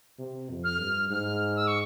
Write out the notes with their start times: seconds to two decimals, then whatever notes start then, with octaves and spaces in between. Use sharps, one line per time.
0.19 C3
0.50 F2
0.64 F6
0.79 G2
1.10 G#2 F6
1.56 E6
1.67 C#6